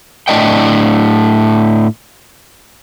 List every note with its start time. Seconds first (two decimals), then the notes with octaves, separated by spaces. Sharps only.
0.28 A2 D4 D#5 G5